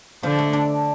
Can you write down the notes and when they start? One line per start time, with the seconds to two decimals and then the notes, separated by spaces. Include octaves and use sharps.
0.23 D3 F3
0.39 A3
0.53 D4